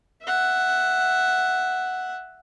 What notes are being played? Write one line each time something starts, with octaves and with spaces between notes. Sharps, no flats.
E5 F#5